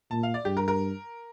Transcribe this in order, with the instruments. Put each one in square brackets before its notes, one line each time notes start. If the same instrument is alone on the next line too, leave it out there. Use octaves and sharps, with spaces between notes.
[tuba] A#2 [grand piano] A5
[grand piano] F5
D5
[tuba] G2 [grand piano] G4
[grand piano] A#4
A#4